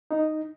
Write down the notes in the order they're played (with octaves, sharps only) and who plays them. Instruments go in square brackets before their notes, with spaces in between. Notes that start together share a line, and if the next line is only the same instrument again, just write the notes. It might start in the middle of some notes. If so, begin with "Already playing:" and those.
[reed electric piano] D#4